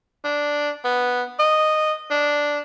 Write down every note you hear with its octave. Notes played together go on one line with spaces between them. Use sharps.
D4
B3
D#5
D4